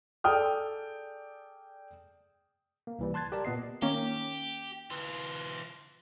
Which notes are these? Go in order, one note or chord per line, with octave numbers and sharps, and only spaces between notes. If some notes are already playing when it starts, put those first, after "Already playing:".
G#4 A4 D5 G5 D#6 F6
A#3
C2 E3 G3
A5 C6 F#6 G#6 A6
G4 A#4 D5 A5 F#6
A#2 B3 D#5 C7
D#3 A#3 C#4 G4
E3 F4